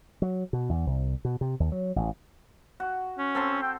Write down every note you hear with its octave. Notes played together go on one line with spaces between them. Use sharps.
F#3
B2
E2
C2
B2
C3
D#2
F#3
A1
F#4
C#4
C4 A4 C6
G5